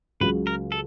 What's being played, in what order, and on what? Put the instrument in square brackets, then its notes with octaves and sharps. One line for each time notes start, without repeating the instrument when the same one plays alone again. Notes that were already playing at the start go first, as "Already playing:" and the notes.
[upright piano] C#2 C#3 F#3 [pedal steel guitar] B4
[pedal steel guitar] A#4
A4